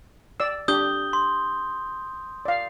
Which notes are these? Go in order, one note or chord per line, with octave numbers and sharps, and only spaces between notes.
D5 E6
D4 G4 D#6 G6 G7
C6
D5 F5